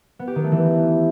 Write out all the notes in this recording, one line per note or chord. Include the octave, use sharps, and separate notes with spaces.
B3
G4
D#3
A3
E3